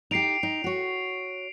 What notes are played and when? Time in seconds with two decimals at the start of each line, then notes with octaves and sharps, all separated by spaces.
0.11 D#4 G4 C7 D7 F7
0.43 D#4
0.64 F#4 C#5